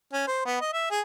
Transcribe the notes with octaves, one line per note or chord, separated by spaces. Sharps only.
C#4
C5
B3
D#5
E5
G#4